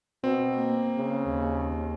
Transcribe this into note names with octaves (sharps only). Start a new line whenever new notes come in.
B2 C4
A#3
C#3
D#2